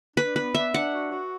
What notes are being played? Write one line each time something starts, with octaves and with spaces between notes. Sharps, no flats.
D4 B4
B3 B4
D4 E5
D4 F#5
F#4
F#4